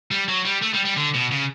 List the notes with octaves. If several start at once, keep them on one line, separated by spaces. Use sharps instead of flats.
G3
F#3
G3
A3
G3
G3
D3
B2
C#3